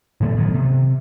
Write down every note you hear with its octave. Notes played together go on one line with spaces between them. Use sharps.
A2 D3 A3 B3
G1 D#3 F#3 B3
C3